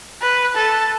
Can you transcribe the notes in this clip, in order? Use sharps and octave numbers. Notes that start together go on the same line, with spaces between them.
B4
A4